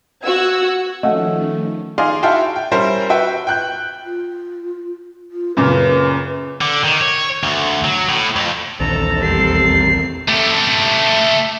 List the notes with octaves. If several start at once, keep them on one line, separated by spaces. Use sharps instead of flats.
F#4 F#5 E6 G#6
D#3 F3 A3 C#4 D#5 F5 F#5
D#4 G#4 D5 F5 C6
E4 F#4 F5 G5 A5 C6
G5
G3 C#4 E4 A#4 C5
F#4 B4 E5 G5
G5 F#6 G6
F4
F4
F#2 A#2 C#3 B4
D3
D#3
C#5
D2
F#3
A2
F2
A#1 D#2 E3 C4 D4 A4 A#5
E2 G3 C4 A#4 C7
A3 G4